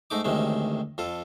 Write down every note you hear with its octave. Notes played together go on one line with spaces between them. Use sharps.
G#2 A3 D#4 D6
A1 D2 C3 D#3 G#3
F2 F4 A4